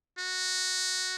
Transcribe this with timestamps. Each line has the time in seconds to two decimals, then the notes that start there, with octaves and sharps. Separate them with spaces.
0.19 F#4